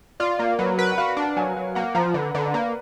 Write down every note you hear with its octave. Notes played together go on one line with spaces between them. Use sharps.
F4 D5
A#3 D5
F#3 B4
A#4 B4
F#5
F#4 F5
D4
F#3 G#5
F#3
A#3 F#5
F3 A#5
D3 B4
D3 B4
D5
A#3 B4